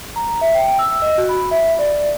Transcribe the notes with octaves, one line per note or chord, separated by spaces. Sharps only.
A#5
E5
G5
E6
D#5
F#4
B5
E5
D5